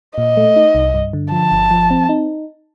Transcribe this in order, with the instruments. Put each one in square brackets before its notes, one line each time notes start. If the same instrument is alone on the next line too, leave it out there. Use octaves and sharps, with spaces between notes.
[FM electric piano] A#2 [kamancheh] D#5
[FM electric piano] A3
D#4
C2
G2
D3
[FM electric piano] F3 [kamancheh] A5
[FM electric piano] G1
F3
C4
D#4